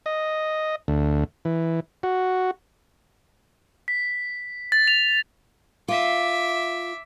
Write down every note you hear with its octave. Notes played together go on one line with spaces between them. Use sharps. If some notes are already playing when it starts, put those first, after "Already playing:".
D#5
D2
E3
F#4
B6
A6
F7
F4 E5 D6